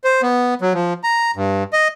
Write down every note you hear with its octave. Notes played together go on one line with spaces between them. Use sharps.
C5
B3
F#3
F3
A#5
G2
D#5